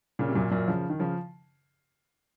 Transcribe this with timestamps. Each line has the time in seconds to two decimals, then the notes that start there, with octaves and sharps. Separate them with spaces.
0.19 A#2 C#3
0.29 C3
0.35 F#2 A#2
0.51 F#2 A#2
0.68 C#3 F3
0.90 D#3
0.99 C#3 F3